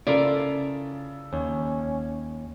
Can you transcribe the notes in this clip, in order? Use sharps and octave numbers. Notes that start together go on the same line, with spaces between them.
C#3 E4 F4 A4 A#4 D5
D#2 C#4